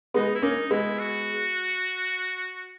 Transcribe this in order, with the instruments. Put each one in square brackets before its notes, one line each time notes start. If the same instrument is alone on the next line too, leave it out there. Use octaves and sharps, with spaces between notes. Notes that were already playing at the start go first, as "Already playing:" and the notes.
[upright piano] G#3 B3 [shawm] D#4
[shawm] E4
[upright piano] A#3 C#4 [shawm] D#4
[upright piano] G#3 B3 [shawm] E4
[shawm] F#4